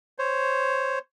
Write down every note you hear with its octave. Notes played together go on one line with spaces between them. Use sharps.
C5 C#5